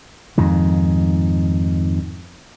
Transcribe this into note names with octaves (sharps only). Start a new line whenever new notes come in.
F2 G#2 D#3